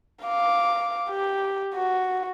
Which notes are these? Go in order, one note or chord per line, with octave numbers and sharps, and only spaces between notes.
F5 D6
G4
F#4